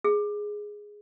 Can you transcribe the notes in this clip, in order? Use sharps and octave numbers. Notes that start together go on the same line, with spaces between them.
G#4